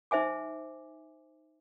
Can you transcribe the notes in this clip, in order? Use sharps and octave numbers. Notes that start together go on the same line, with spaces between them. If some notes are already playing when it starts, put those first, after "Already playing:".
D#4 C5 E5 G#5 D6